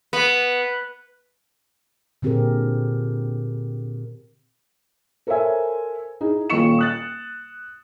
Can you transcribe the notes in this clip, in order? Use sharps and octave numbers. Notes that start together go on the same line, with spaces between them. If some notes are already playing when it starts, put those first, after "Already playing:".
B3
A#2 D3 C4 G4 G#4 A#4
A4 A#4 C5 C#5 E5 G#5
D#4 E4 G#4
D#1 A#2 D#5 C#6 C#7 E7
D#6 F#6 A6